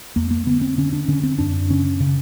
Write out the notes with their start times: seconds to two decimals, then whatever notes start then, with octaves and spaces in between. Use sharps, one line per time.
0.16 F2 A#3
0.31 A#3
0.47 D3 B3
0.62 C4
0.78 D3 C#4
0.93 D4
1.08 D3 C#4
1.23 C4
1.39 F#2 D4
1.70 C#3 C#4
2.00 C#3